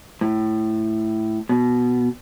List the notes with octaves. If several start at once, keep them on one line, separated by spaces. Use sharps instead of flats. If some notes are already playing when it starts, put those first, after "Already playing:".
A2
B2